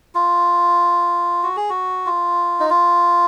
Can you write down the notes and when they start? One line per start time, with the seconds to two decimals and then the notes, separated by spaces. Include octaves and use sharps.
0.15 F4
1.43 F#4
1.57 G#4
1.70 F#4
2.06 F4
2.60 D#4
2.70 F4